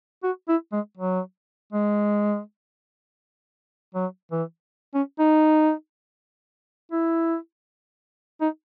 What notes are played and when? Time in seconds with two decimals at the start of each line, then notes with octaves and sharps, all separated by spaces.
0.23 F#4
0.48 E4
0.72 G#3
0.97 F#3
1.72 G#3
3.95 F#3
4.32 E3
4.94 C#4
5.19 D#4
6.92 E4
8.41 D#4